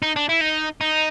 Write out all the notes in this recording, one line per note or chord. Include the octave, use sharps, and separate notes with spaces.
D#4
D4
E4
D#4
D#4